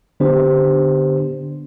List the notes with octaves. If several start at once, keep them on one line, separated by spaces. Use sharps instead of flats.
D3 B3 D4 G4 C5